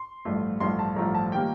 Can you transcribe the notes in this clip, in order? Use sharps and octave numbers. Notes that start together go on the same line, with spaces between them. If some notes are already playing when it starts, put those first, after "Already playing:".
Already playing: C6
A1 G2 F3 A3
A1 G2 F3 A3 C6
A5
A1 G2 F3 A3 A#5
A5
D#3 G3 A#3 G5